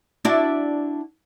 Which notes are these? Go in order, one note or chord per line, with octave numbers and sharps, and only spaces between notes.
D4 E4 F#4